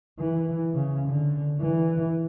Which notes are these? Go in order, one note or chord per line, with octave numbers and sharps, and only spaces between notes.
E3
C#3
D3
E3